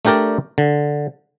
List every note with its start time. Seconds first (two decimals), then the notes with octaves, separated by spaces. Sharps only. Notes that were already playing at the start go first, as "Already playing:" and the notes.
0.05 A3 D4 G4 A#4 D5 G5
0.58 D3